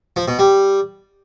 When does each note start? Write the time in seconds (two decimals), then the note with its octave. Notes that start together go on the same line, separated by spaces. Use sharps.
0.16 F3
0.28 B2
0.39 G3